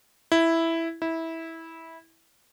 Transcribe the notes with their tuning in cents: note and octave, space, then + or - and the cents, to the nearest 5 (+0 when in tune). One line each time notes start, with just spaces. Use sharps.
E4 +0
E4 -15